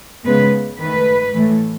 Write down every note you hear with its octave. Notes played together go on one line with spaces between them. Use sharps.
C#3 G#3 B3 B4
D#3 A3 B4
A2 E3 A3